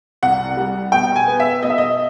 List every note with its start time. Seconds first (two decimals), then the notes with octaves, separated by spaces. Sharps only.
0.22 C2 F#5
0.57 G3
0.92 B2 G5
1.16 G#5
1.28 B3
1.40 E5
1.63 B2 D#5
1.70 E5
1.78 D#5